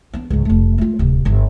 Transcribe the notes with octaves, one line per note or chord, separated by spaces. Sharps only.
B3 D4
C#2 G#2
F1 A3
A3 F4
D1 C3
G1 G2